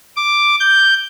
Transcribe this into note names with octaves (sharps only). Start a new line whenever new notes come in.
D6
G6